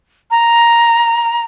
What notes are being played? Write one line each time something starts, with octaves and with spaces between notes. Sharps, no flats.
A#5